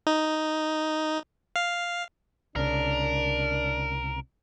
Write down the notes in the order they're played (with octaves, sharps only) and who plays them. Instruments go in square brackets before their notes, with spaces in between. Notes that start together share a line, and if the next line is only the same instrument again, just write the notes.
[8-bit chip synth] D#4
F5
[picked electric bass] C2 C#3 [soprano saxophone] D4 [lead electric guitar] A#4